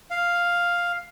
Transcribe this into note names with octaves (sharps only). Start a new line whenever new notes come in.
F5